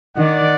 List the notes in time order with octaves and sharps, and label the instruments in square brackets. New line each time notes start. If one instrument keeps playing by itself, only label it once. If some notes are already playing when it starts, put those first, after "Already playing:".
[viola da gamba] D#3 [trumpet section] D5 F#5